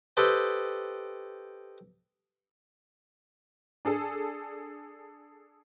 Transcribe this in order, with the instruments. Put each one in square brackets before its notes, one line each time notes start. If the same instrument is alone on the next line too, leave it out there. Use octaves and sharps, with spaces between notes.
[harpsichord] G4 A4 B4 C5 D#5 G5
[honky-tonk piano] D4 G#4 A4